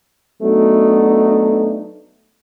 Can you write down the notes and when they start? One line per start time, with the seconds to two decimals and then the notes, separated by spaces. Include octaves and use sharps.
0.42 F#3 A3 B3 D4 D#4 F#4